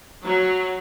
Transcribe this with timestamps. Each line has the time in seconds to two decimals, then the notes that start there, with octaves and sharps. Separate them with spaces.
0.25 F#3